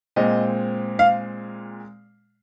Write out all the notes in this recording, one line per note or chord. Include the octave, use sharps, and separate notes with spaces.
A#2 G#3 C4 D#5
F5